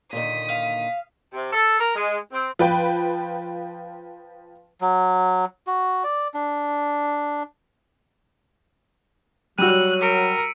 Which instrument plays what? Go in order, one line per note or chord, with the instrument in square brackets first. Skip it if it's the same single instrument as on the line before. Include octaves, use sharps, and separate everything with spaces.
[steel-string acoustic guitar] A#2 D3 D#3 [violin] D#6 B6
[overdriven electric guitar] F5
[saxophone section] C3
A4
A#4
G#3
C4
[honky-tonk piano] F3 B4 G5
[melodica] F#3
F#4
D5
D4
[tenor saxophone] F#3 [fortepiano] G3 F#4 [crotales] E6 D#7 [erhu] F#6
[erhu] A#4 [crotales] B6 C#7 D7